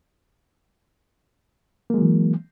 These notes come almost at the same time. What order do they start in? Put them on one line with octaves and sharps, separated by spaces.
A#3 G#3 F#3 E3